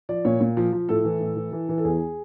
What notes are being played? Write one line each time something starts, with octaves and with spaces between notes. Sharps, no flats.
F3 D5
A#2 C#5
A#2
F3
F3
A2 A4
E3
A2
E3
E3
E3
A4
E2 G#4